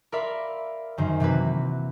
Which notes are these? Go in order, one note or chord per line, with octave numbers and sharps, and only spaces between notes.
A#4 D5 E5 F5 B5 C6
F#2 D#3 C5
C3 E3 F#3 A#3 F#4 B4